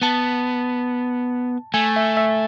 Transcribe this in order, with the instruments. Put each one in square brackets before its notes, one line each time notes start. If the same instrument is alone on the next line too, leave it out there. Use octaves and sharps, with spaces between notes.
[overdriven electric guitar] B3 [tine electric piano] A5
[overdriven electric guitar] A3 [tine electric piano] G#5
[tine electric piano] E5
E5